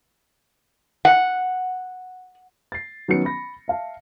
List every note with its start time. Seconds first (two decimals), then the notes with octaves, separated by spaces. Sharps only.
1.05 F#5
2.72 A6 C7
3.08 D#3 F#3 B3 C#4 C#7
3.25 B5 A#6
3.68 E5 F5 A5